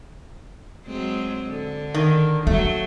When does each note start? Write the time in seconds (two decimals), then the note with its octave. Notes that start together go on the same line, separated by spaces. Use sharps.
0.86 F#3 G#3 C4
1.48 D3
1.94 D#3
2.47 F#3 A3 A#3